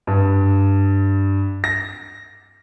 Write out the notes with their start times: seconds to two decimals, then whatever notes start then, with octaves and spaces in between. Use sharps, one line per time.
0.07 G2
1.64 A#6